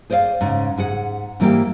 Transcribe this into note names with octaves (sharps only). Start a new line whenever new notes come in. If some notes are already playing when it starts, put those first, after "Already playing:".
G#4 C5 D5 D#5 F5
G#2 C#3
G#2 G#4 F#5
G#2 E3 G3 A#3 G4 G5